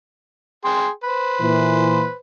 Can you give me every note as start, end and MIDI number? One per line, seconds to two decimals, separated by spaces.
0.65 0.89 68
0.65 0.89 79
0.65 0.89 84
1.04 2.15 71
1.04 2.15 72
1.40 2.06 46
1.40 2.06 52